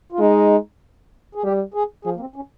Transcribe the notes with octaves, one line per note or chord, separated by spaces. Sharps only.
F4
G#3 D#4
G#4
G3 G4
G#4
F3 G#4
A#3
C4
C#4